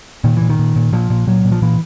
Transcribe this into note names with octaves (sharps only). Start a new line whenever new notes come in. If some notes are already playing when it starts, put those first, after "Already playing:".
A#2 D#3
A#2 E3
D#3
A#2
A#2
A#2 F3
A#2
A#2 F#3
A#2
F3
A#2 E3